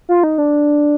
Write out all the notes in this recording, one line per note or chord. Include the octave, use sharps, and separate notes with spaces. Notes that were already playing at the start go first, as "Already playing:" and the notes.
F4
D#4
D4